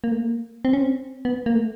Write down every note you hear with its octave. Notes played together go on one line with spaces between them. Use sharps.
A#3
A3
A#3
C4
C#4
C4
B3
A#3
A3